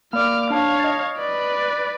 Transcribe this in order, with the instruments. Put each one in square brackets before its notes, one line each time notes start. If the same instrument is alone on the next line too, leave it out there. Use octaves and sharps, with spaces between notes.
[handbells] A#3 D5 [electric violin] D6 F6
[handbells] D4 A5 [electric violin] C#5 F5
[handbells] D#5 A6
[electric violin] B4 D5